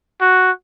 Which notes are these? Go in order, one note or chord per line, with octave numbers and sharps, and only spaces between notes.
F#4